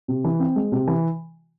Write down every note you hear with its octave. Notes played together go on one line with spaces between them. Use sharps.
C3
E3
C4
G#3
C3
E3